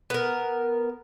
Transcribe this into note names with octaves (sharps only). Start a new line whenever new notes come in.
B3 A#4